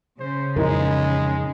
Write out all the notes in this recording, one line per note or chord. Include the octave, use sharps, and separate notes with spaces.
C#3 C5
F2 A#2 E3 G#3 D#4 A#4